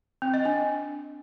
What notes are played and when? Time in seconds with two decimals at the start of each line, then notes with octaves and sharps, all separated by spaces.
0.22 C4
0.34 D#5
0.45 D4